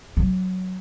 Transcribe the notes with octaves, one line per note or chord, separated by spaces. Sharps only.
F#3